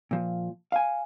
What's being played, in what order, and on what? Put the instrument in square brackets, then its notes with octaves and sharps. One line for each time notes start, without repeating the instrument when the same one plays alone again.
[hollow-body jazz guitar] A#2 F3
F5 G#5